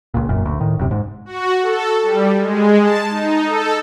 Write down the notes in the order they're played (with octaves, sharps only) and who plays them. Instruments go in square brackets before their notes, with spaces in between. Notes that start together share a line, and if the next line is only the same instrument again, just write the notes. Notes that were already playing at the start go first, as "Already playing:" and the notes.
[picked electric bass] C#2 A#2
E1 F#2 A#2
D2
A2 D#3
D1 F#2 C3
G#2
[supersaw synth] F#4
A4
G3
G#3
A5
D#4
A4